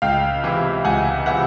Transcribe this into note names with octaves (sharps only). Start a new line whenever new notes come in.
C#2 F5 G5
C3 E3
C#2 F#5 G#5
C3 E3 E5 F#5